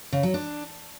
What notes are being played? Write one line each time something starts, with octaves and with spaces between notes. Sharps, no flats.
C#3
F#3
D4